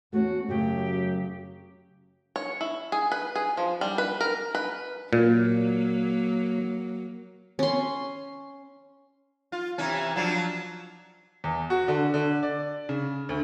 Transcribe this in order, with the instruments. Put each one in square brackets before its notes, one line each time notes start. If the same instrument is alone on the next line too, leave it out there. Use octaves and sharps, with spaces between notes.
[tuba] E2 [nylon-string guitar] A3 C#4 [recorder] F#4
[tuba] F#2 [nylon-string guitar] C#3 F#3 A3 [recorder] G4
[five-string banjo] C#5
E4
G#4
B4
G#4
F3
G3
B4
A#4
B4
[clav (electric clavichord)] A#2 [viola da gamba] F#3 A#3
[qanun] C#4 C6
[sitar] F4
C3 E3 C#4
F3 F#3 D4
[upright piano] E2
F#4
D3
D3
D5
C#3
D2